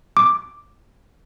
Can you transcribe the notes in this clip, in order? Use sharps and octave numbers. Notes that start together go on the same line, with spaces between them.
D6